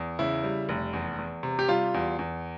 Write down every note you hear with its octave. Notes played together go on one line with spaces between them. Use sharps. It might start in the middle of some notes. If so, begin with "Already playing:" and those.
Already playing: E2
C#3 E4
G3
F1
E2
E2
C3
G4
G3 F4
E2
E2